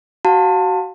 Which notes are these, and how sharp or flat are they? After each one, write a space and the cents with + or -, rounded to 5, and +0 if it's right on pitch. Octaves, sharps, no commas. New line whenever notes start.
F#4 +25 F5 +30 A5 +25